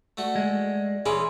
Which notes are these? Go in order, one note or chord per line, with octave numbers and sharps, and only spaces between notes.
A3 F#4 D5
G#3
E3 C#4 G#4 B5 C6 D6